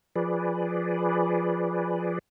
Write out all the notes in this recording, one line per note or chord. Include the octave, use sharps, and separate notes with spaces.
F3 G#4 B4 D5